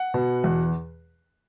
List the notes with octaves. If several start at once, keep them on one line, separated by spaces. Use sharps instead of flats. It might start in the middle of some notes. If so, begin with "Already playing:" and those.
Already playing: F#5
B2
E2